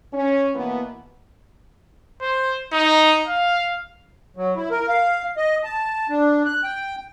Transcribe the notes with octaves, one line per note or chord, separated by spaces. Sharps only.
C#4
B2 E3 A#3 B3
C5
D#4
F5
F#3
E4
A#4
F5
D#5
A5
D4
F#6
G5